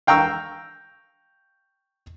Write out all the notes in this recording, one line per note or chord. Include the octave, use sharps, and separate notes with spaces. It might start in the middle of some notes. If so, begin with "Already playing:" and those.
F5 G5 A#5 C#6 E6